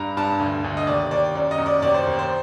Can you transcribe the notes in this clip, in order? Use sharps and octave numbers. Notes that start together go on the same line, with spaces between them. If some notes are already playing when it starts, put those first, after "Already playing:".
Already playing: G2 A#5
G2 A5
D2
D2
D#5
D#2 D5
D#2 D5
F#2 D5
D#5
F#2
D5
D#2 D5
C5
D#2
C5